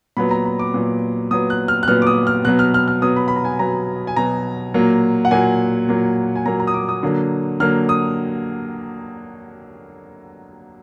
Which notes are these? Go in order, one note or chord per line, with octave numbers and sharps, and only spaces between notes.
A#2 F#3 B3 B5
A#5
B5
D6
A#2 F#3 B3
A#2 F#3 B3 D#6
F#6
F6
F#6
A#2 F#3 B3 F6
D6
D#6
F6
B2 F#3 B3 F#6
F6
F6
F6
B2 F#3 B3 D#6
B5
B5
A#5
G#5
B2 F#3 B3 A#5
G#5
B2 F#3 B3 A#5
A#2 F#3 A#3
F#5
A#2 F#3 A#3 G#5
A#2 F#3 A#3
G#5
A#2 F#3 A#3 A#5
A#5
D#6
D6
D#6
D3 F#3 A#3
D3 F#3 A#3 F6
D#6